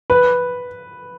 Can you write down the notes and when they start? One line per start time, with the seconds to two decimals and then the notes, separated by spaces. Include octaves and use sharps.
0.10 B4